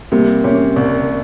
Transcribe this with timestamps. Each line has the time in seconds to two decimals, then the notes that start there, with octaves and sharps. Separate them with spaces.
0.12 C3 G3 A#3
0.44 C3 A#3 C#4
0.76 C2